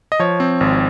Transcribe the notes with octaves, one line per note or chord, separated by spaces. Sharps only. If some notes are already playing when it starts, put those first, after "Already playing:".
D#5
F3 C#5
C4
G#1